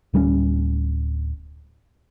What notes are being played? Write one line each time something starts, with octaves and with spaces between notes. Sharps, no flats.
D1 G3 B3 C#4